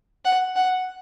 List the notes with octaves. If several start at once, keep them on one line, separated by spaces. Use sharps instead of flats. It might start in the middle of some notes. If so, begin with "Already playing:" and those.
F#5
F#5